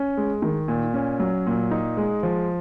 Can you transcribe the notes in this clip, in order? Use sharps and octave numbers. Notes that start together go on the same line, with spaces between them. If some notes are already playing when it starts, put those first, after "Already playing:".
Already playing: C#4
G#3
D#3
A#2
C#4
F#3
A#2
D#4
G#3
F3